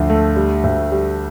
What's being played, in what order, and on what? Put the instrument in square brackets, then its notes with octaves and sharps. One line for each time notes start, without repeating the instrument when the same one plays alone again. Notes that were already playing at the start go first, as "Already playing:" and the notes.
Already playing: [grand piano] D2 F3
A3
G3
D2
G3